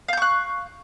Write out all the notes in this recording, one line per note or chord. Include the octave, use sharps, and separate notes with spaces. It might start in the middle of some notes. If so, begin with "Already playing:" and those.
F5 C#6 F#6 G6